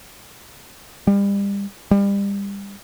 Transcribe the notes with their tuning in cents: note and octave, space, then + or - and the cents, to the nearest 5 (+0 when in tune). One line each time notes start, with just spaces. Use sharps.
G3 +35
G3 +30